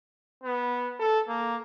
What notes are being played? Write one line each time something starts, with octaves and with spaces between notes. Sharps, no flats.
B3
A4
A#3